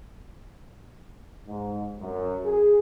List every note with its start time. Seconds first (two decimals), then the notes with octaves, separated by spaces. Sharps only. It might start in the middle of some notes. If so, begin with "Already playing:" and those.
1.48 G#2
1.99 F#2
2.44 G#4